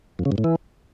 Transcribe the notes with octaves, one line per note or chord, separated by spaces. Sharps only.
F2
C#3
G2
A2
E3